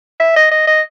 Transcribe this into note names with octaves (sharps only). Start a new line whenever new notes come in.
E5
D#5
D#5
D#5